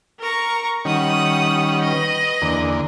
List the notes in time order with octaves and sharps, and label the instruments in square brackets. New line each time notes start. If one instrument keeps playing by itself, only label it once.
[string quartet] A#4 A#5 C#6
[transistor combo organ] D#3 G3 C#4 [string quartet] F#5 D#6
[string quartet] B4 D#5
[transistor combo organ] E2 D3 A#3